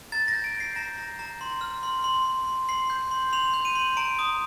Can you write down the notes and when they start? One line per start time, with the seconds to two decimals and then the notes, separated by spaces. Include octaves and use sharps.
0.12 A#5 A6
0.28 A#6
0.33 G6
0.44 D7
0.55 G6
0.60 C7
0.76 A#5 A#6
0.98 A#5
1.19 A#5
1.41 C6
1.61 F6
1.83 C6
2.04 C6
2.25 C6
2.47 C6
2.69 C6 C7
2.90 G6
3.11 C6
3.33 C6 F7
3.54 G6
3.65 D#7
3.75 C6
3.97 A#5 D7
4.19 D#6